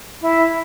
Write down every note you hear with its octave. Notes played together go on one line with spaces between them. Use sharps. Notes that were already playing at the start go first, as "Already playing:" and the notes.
E4